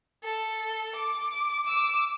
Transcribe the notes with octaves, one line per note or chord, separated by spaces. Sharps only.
A4
D6
D6 E6